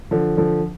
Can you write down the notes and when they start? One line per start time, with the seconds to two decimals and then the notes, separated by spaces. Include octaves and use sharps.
0.11 D3 F3
0.37 D3 F3